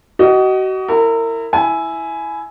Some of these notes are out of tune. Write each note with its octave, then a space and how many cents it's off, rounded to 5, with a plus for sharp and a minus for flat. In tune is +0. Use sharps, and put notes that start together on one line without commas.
F#4 +35 D#5 +0
E4 +0 A#4 -30
E4 +0 G#5 +15